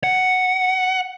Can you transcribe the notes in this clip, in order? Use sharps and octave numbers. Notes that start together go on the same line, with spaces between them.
F#5